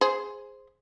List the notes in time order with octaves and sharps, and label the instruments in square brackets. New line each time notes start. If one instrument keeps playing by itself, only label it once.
[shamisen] G#4 C5